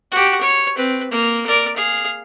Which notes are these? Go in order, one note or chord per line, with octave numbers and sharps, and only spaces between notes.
F#4 G4
C#5
C4 B4
A#3
A#4 D5
G#4 F5